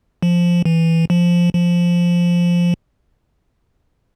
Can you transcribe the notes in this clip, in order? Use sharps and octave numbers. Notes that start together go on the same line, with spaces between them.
F3
E3
F3
F3